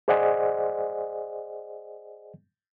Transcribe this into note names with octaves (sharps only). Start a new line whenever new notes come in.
G#4 C5 D5 D#5 F#5 G#5